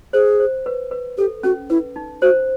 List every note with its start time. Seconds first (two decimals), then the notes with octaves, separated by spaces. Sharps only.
0.13 G#4 C5
0.40 C5
0.66 B4
0.91 B4
1.18 G4 A4
1.43 C#4 F#4
1.70 E4 B4
1.96 D#4
2.22 F#4 C5